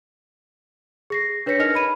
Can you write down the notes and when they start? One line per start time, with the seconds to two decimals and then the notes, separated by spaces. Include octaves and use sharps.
1.10 G#4 A#6 C7
1.46 D4 B4 C#5 A#6 B6 C#7
1.59 D#4 A#4 D#5 F6 A#6 F7
1.74 D#5 B5 D#7